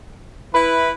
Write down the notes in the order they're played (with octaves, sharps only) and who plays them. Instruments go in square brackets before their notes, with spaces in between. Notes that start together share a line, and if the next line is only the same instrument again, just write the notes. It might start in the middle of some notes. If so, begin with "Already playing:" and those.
[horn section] E4 B4 [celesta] B5